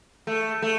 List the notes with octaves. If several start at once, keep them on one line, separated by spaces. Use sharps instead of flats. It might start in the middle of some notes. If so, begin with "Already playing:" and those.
A3
A3